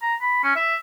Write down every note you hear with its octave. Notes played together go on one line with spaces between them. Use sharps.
A#5
B5
C#4
E5